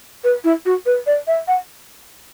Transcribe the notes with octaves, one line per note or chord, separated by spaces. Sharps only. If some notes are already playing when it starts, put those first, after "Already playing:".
B4
E4
F#4
B4
D5
E5
F#5